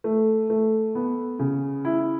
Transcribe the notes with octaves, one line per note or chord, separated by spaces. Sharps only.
A3
A3
B3
C#3
E4